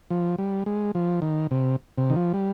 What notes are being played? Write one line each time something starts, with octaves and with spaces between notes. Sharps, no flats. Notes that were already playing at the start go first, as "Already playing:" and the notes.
F3
G3
G#3
F3
D#3
C3
C3
D#3
F3
G3